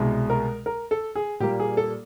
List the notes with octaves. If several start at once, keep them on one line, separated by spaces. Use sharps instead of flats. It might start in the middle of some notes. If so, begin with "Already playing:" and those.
Already playing: C2 B2 G#3
A#4
A#4
A4
G#4
A#2 G3 A#3 G4
G#4
A4